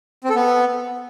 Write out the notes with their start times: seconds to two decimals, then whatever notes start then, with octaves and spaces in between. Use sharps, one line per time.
0.24 C4
0.30 A4
0.35 B3